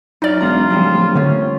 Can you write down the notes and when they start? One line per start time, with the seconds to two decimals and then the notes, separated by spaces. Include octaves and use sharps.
0.22 F#2 D#4 D5 D6 F6
0.41 E1 F4 A#5
0.70 D1 A#2 F3 G3
1.15 D3 A3 C#4